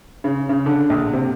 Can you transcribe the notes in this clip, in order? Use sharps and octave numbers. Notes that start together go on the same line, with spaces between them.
C#3
C#3
D3
A#1
C3